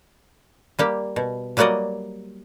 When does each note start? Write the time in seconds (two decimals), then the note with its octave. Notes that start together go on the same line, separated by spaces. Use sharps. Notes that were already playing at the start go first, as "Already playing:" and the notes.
0.79 G3 A#3 G4
1.16 B2
1.57 F#3 G3 A#3 F#4 D5 D#5